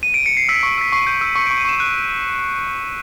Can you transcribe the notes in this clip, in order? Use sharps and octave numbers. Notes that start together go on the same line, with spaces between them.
D#7
D7
C#7
C7
E6 B6
C#6
E6 B6
C#6 C7
G6
E6
C#6 C#7
D7
C#6
D#7
C#6 E7
F#6 D#7